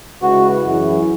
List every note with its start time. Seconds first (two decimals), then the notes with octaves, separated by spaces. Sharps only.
0.22 C#3 G#3 E4 F#4 B4
0.64 F#2 E3 C#4 E4 G#4